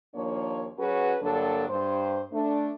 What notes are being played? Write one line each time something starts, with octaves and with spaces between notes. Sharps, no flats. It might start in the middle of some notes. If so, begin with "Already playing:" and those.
D#2 F3 A#3 D4 C#5
F#3 C#4 F#4 G#4 B4
G2 D3 F#3 A#3 D4 A4
G2 C5
A3 D4